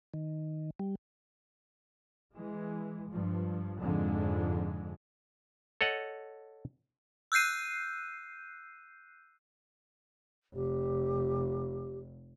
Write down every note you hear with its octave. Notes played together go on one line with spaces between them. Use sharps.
D#3
G3
E3 G#3
G2 F3
F2 G#2 D3 G#3
A4 C#5 D#5 F#5
E6 F#6 G6 C7 D#7
F1 G4